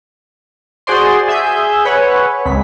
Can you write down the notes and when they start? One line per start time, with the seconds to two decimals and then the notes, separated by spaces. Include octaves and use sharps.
0.87 F#4 G#4 C5 D5 C6
1.28 G#4 E5 G#5 E6 G6
1.85 B4 C#5 F#5 G#5
2.45 C#2 B6